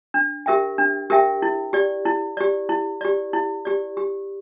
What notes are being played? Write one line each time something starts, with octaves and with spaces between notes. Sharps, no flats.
D4
G4 A#4 E5 G5
D4
G4 A#4 E5 G5
E4
G4 D5
E4
G4 D5
E4
G4 D5
E4
G4 D5
G4